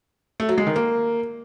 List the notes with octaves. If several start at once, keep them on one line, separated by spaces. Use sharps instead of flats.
A3
F#3
G#3
D#3
A#3